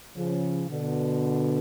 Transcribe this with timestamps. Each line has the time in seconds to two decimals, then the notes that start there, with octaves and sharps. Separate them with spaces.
0.16 C#3 F3
0.69 B2 D3